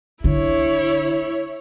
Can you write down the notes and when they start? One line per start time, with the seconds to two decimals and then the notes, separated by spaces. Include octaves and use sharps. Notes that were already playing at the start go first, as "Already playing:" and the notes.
0.24 D3 E4 C#5